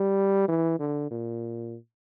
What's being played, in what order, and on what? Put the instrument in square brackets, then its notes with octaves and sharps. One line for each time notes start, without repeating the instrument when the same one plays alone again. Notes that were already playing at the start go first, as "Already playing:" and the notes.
Already playing: [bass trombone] G3
E3
D3
A#2